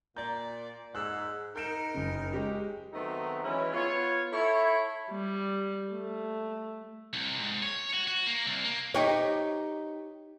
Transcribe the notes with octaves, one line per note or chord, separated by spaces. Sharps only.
A#2 D5 A#5 G6
G#2 E6 F#6
D#4 A#4 G6 D7 E7
F#1 C#3
G#3 C#4 G4
D#3 F#3 A3 B3 C4 D#4
E3 F#3 G#3 C#4 E4
B3 F4 C#5
E4 A4 C#5
G3
A3
C2
G#2
C#5
F#4
F#4
A#3
C2
A#3
D#4 G4 C#5